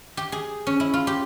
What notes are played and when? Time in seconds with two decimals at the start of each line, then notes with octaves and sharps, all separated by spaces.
0.17 G4
0.32 G#4
0.67 C#4
0.80 E4
0.94 F4
1.07 G4